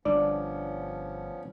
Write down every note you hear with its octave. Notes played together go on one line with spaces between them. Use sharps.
G1 F3 B3 C#4 D4 D5